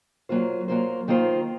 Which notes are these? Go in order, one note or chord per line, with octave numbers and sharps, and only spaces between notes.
F#3 A#3 F4 C5
F#3 A#3 F4 C5
D#3 A#3 F4 C5